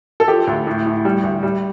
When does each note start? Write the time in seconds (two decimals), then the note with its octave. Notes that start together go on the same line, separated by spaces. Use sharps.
0.20 A4
0.28 F3 G4
0.47 D2
0.67 A2
0.86 A2
1.05 G3
1.23 D2
1.43 G3